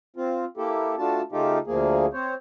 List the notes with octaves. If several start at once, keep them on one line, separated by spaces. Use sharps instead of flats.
C4 F4
A#3 E4 G4 A4
A3 D4 F4 F#4 A5
C#3 A3 D#4 F4 G4
D2 F3 A#3 G#4
C4 C5 C#5